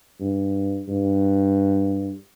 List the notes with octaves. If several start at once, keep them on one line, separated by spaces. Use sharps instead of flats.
G2
G2